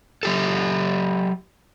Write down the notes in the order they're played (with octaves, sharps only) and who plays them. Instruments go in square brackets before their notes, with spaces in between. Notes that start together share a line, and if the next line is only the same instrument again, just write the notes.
[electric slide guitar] F#3 G4 A4